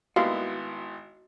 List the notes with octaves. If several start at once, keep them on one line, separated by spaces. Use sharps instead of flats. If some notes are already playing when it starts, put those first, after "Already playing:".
G#1 D#3 G3 A#3 B3 E4 F#4 F5